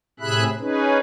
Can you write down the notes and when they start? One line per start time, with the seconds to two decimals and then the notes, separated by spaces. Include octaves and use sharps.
0.20 A2 C3 G#4 E5 B5 F#6
0.59 C#4 D#4 G#4 B4